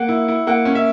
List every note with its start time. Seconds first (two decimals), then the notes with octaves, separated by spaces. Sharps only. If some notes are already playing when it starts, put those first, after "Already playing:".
Already playing: A#3 F#5
0.09 E4
0.28 E4
0.47 A#3 F#5
0.65 C#4
0.75 E5